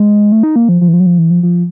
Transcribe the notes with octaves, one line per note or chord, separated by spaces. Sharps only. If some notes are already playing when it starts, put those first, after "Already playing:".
Already playing: G#3
A3
D#4
A#3
F3
F3
E3
F3
F#3
F3
E3
F3
F3